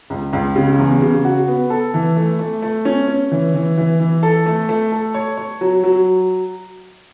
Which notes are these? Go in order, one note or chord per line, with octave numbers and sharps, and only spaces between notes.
C#2
C#2
C#3
E2
C#3
F#4
B3
A4
E3
A3
A3
A3
C#4
C#4
E3
E3
E3
E3
A4
A3
A3
A4
C#5
C#5
F#3
F#3